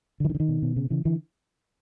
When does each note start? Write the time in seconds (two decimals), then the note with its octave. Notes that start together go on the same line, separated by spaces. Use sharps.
0.20 D3 E3
0.29 D#3
0.35 D3
0.40 D#3
0.49 B2
0.62 B2
0.76 C#3
0.90 C#3 E3
1.05 D3 E3